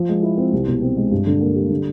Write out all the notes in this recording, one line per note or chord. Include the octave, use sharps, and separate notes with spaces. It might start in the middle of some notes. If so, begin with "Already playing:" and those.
Already playing: F3
G#3
E4
C4
C2
B2
C4
G#3
G2
D3
A#3
G3
D3